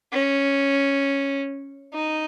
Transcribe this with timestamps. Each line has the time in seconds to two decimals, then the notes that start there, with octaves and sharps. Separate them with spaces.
0.13 C#4
1.93 D#4